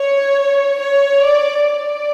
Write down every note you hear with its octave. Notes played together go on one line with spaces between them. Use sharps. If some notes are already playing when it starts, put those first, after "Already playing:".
Already playing: C#5
C#5
D5
D5